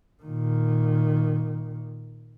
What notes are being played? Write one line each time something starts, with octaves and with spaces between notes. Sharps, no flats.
A#2 D#3